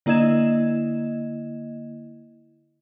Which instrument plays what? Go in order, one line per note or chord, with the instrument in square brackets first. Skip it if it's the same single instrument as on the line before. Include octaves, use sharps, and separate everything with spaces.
[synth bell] D3 A#3 E4 D#5 G#6 E7